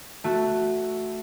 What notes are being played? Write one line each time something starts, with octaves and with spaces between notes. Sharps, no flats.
A3 F#4